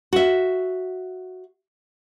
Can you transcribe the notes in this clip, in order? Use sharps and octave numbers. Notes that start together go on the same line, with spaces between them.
F#4 E5